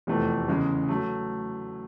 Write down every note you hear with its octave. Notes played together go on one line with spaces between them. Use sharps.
F1 E2 C3 E3 A3
E2 C#3 E3 G#3
F#3 A3